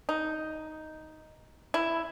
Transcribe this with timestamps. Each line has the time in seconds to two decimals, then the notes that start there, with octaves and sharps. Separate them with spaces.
0.09 D#4
1.74 E4